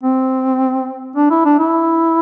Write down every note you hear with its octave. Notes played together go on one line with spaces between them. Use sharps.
C4
D4
E4
D4
E4